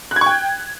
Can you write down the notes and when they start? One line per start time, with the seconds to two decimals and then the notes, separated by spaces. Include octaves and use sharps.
0.11 F#6
0.16 G#6
0.21 C#6
0.26 G5